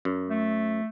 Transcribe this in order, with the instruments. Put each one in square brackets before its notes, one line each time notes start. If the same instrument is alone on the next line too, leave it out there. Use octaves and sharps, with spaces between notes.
[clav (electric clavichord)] F#2
[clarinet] A3